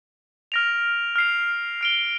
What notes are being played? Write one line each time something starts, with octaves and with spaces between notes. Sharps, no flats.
F6 A#6 D7 F7
F6 C7 F7
F6 D7 G7